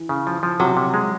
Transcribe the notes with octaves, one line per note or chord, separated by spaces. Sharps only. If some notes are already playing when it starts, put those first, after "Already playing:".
Already playing: E3
C#3
F3
F3
C3 F#3
C3
G#3